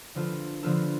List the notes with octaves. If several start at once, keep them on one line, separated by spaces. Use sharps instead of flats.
D3 F3 B3 F4 A4
D3 F3 B3 F4 A4